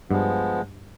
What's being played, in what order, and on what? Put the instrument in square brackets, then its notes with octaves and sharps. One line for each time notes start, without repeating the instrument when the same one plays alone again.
[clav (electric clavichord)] G2 [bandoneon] F3 G#3 B3